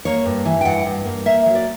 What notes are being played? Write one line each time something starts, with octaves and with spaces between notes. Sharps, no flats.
A#3 C#5
G2
E3
G5
G2 F#5
G2
A#3
A#3 E5
F#3
D5